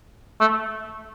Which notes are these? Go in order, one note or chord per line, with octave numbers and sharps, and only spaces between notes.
A3